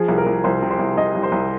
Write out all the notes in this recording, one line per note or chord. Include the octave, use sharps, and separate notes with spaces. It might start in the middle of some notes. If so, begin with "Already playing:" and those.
Already playing: F3 G#4
C2
A#4
C2
C2 C5
C3
C5
C2
C3 D#5
C2
C5
C2